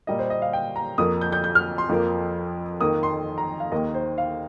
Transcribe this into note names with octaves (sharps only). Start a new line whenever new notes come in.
A#2 G3 A#3 D#5
C5
D#5
F5
G5
A#5
F2 F3 A#3 D#6
G6
G6
G6
F6
C6
F2 F3 A#3
F2 D#3 A#3 D#6
C6
A#5
F5
D#2 D#3 A#3 D#5
C5
F5